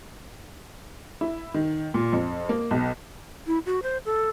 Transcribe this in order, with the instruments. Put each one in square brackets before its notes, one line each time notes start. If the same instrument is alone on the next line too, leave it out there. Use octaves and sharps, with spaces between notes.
[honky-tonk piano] E4
D#3
A#2
F2
A#3
B1
[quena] E4
F#4
C5
A4